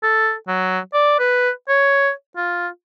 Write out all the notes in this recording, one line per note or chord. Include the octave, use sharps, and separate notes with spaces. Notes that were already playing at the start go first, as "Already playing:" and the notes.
A4
F#3
D5
B4
C#5
F4